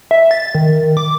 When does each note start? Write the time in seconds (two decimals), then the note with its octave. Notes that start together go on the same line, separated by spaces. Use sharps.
0.11 E5
0.31 A6
0.55 D#3
0.97 D6